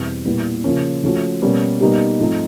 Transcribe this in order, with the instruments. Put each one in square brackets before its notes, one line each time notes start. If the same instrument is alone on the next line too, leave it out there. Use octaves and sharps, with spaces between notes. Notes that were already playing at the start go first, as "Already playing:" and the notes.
Already playing: [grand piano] E2 B2 G3 C4
A#2 G3 B3 E4
C#3 F3 A#3 C#4
F3 A3 C#4 F#4
B2 G3 A#3 C#4
B2 G3 A#3 D#4 G4
G#2 F3 A3 C4 D#4